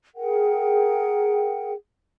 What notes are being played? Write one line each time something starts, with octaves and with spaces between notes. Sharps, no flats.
G#4 A#4 F#5 G5